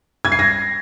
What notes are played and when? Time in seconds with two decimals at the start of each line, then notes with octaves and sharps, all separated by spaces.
0.25 G#6
0.32 C7
0.39 A#6